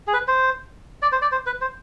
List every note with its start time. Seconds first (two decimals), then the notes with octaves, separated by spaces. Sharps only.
0.07 G#4
0.13 B4
0.28 C5
1.02 D5
1.12 C5
1.22 D5
1.32 C5
1.46 B4
1.61 C5